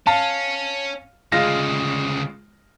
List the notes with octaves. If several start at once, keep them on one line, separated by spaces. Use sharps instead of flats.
C#4 F5 A5
D2 C#3 G#3 F4 A#6